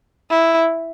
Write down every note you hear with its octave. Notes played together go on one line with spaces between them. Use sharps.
E4